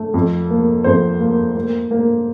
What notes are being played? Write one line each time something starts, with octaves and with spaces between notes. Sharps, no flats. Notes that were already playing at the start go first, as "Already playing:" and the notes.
Already playing: A3
F2
A#3
F2 C5
A#3
A#3
A#3